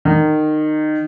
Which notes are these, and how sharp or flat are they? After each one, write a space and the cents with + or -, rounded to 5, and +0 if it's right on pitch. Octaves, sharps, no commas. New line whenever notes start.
D#3 -20